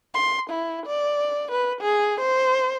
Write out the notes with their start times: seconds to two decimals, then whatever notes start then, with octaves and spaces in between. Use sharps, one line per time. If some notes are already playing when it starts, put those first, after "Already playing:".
0.15 C6
0.50 E4
0.86 D5
1.51 B4
1.81 G#4
2.20 C5